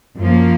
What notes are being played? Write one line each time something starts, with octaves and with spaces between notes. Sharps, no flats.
F#2 F3 A#3